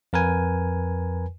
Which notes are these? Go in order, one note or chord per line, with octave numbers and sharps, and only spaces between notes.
F2 A#4 B4 G#5